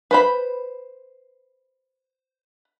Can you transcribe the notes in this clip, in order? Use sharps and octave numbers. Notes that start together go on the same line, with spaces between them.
B4 C5 B5